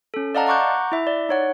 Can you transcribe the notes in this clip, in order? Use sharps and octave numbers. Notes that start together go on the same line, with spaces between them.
C#4 A4
D5 D#5 F5 F#5 A5 A#5
F#5 A#5 C#6 D6 F#6 G6
E4 E5
D5
D#4 C#5 F#5